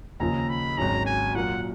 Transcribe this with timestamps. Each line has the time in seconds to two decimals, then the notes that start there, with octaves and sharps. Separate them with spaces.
0.20 D#2 C#3 F3 A#5
0.49 B5
0.78 G#1 G#2 F#3 C#4 A#5
1.06 G#5
1.35 A#2 F#3 A#3 F4 A#4 F#5